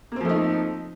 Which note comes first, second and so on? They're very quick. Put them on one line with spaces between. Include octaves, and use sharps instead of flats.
A#3 C4 F3 A3 D#4